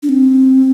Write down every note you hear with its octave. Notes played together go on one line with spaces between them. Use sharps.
D4
C4